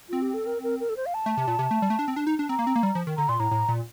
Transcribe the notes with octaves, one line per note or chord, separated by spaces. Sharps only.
C4 F4
G4
A4
A#4
A#4
A#4
A4
C5
F5
A5
A3
C3
A#2
C3
A3
G3
A3
D4
C4
D4
D#4
D4
C4 A#5
A#3
C4
A#3
G3
F3
D#3
D3 A#5
A#2 C6
A2 A#5
A2
A#2